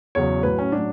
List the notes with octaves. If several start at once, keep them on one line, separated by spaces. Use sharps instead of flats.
E2 C#3 F#3 C#5
A2 F#3 B4
C#4
A2 F#3 D4